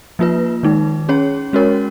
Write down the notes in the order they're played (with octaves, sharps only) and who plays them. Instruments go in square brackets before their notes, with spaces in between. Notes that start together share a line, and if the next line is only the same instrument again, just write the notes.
[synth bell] F3 A#3 F4 B4
D#3 G#3 D#4
C#4 G#4 C#5
G#3 C#4 F#4 A#4 C#5